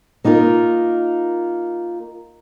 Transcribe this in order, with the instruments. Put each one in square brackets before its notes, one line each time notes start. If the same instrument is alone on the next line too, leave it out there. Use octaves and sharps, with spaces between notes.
[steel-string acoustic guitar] A#3 D#4 F4 A#4